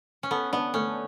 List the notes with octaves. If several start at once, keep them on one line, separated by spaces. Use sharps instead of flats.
C#4
B3 A4
B3 D4
A3 C#4